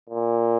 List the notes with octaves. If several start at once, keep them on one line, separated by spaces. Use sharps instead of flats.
A#2